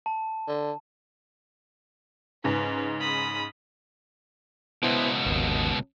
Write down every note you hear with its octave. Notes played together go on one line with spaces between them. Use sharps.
A5
D3
G#2 C#3 B4
B5 D#6
C#2 B2 B3 E4 C5
G#1 D#2